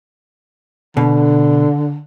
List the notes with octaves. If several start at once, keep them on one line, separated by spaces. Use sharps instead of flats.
B2 D3